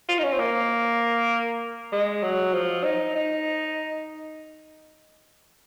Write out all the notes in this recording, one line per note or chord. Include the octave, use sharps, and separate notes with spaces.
F4
D#4
C#4
C4
A#3
G#3
F#3
F3
D#4
D#4